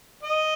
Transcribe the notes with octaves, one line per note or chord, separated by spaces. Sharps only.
D#5